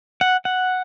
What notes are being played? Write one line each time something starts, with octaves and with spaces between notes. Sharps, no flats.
F#5
F#5